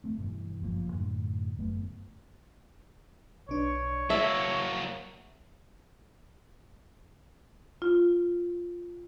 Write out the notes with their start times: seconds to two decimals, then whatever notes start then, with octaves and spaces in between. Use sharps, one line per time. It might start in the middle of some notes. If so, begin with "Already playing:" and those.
0.04 A3 C4
0.18 G2 B2 E3
0.60 G1 F#2 F3 A#3
0.93 F#2 A2 D3
1.58 G1 F#2 A3 B3
3.49 B1 D4 C#5
4.10 F#3 A#3 E5 A5
7.82 F4